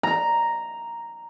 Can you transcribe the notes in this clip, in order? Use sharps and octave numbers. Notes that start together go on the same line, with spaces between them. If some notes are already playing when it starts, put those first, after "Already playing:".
A#5